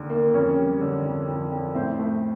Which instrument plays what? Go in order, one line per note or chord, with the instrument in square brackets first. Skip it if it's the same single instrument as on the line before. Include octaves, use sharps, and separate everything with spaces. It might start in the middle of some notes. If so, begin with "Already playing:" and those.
Already playing: [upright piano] D#2 D3
A#3
F2 C#4 C#5
G3
D3
F2
F2
F2
A2 C4 C5
A3